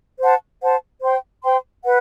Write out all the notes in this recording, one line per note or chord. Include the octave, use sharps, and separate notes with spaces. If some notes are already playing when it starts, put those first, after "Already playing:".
C5 F#5 A5
C5 F#5 A5
C5 G5 C6
C5 G5 C6
B4 F#5